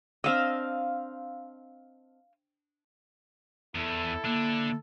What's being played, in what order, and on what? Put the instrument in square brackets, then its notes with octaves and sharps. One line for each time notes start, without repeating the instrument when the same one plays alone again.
[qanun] C4 D4 D#5 [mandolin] F5 E6
[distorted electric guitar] E2 [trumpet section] E4 A4
[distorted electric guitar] D3 D4 [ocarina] A#3